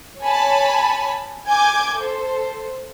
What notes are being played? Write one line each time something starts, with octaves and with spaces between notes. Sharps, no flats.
C#5 G#5 A5 B5
G#5 D6 G6 G#6
A4 C5